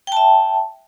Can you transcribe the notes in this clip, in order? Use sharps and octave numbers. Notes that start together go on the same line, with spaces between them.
E5 G5 A5